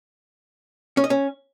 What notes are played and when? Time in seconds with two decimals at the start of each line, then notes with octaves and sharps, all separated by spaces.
0.97 C#4
1.04 D#5
1.10 C#4